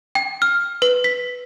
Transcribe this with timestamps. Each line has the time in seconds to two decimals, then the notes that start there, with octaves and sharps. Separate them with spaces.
0.15 G5
0.42 F6
0.82 B4
1.04 B6